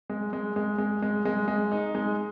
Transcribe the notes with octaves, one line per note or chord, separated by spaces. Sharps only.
G#3
G#3
G#3
G#3
G#3
G#3
G#3
D#4
G#3